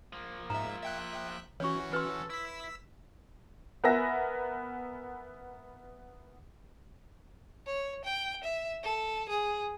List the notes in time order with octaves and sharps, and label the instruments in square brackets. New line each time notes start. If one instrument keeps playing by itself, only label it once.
[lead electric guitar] F3 A#3
[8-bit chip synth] G#2 E5 [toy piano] A#5
[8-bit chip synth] E5 G5 F#6
[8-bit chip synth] E3 C#4 F#4 [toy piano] C#5 C#6
[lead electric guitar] A4 [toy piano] B4 C6
[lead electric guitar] E4 [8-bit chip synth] E6 B6
[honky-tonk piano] B3 A#4 B4 E5 G#5 A#6
[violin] C#5
G5
E5
A4
G#4